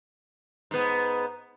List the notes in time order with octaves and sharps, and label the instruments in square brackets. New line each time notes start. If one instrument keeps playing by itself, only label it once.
[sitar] G#2 B3